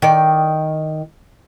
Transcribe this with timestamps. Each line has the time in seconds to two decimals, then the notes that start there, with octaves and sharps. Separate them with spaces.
0.02 D#3 D5